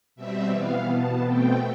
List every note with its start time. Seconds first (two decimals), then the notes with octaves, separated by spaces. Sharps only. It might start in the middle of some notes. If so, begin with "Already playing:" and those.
0.16 B2 G3 C4 E5
0.52 E3 B3 F5
0.87 B2 B3 A5
1.23 B2 A3 C4 G5